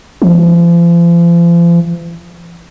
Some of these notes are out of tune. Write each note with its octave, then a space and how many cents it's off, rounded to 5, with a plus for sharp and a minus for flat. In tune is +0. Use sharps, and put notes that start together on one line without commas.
F3 -40